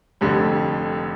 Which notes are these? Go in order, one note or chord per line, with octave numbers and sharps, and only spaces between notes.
F1 F2 D3 G3